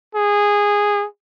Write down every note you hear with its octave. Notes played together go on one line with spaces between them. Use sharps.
G#4